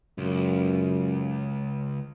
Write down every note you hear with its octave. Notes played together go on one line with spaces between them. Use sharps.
C#2 F#2